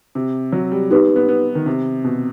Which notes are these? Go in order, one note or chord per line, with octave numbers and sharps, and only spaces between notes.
C3
F#3
G3
B3 D#4 G4 B4
B3
B3
D#3
C3
B2